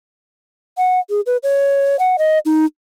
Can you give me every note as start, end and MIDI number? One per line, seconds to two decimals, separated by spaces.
0.78 0.99 78
1.10 1.21 68
1.26 1.37 71
1.43 1.96 73
1.99 2.16 78
2.18 2.38 75
2.45 2.65 63